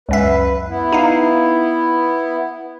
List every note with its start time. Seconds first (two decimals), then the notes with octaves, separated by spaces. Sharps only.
0.09 C#2 F#2 B4 E5
0.68 B3 E4
0.92 D#4 F5